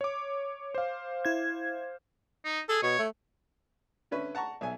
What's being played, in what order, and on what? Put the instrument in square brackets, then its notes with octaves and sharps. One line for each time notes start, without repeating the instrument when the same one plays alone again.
[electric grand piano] C#5 D6
C5 F5
[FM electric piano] E4 G#6
[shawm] D#4
[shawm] G#4 [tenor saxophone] A4
[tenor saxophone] B2 [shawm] C#5
[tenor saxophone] A3
[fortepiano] D3 C#4 B4 E5
F#5 A5 A#5 C#6
B1 E5 G#5